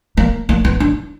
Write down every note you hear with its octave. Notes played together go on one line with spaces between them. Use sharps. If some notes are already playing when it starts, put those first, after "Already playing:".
A#3
A#3
B3
D4